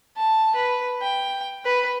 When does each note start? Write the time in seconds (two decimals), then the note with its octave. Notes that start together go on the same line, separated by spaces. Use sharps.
0.17 A5
0.55 B4
1.02 G5
1.65 B4